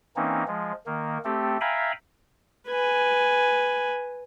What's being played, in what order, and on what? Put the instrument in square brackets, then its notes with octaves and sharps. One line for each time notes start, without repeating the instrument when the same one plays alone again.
[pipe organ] E3 A#3 C4 C#4 D#4
F3 G#3
D#3 A#3
A3 C4 G4 A4
E5 F5 G5 G#5 A#5 B5
[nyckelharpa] B4 G#5